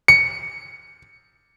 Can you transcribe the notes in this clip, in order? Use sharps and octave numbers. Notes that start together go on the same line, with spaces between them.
C#7